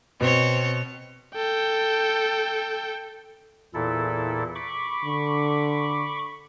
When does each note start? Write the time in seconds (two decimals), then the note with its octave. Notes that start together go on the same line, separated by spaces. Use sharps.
0.21 B2 C4 C#5
1.36 A4 G5
3.74 E2 A#2 E4 A4
4.55 B5 C#6 D6
5.04 D3